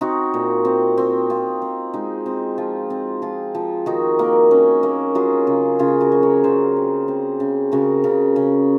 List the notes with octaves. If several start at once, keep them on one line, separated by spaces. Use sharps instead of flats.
C4 D#4 F#4
A#2
C4
C4
C4 F4
C4
G#3 D#4
C4
F3 F4
C4
F3 F4 G#4
F3
D#3 D#4 F#4
A#3
C#4
A#3
F#3 F4 G#4
C#3
C#3 F4 G#4
F#4 A#4
F#3
A#4 C#5
C#3 G#4 C5
C4
C4
C#3
C#3 F#4 A#4
C#3
C#3